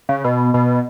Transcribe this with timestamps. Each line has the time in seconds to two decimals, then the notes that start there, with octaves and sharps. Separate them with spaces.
0.09 C#3
0.24 B2
0.54 B2